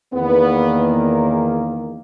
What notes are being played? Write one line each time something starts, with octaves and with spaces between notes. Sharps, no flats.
E2 D#3 A#3 B3
G#4
A#4